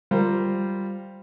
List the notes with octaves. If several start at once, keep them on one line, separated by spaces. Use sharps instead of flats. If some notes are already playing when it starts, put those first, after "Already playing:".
G3 F4 A#4 C5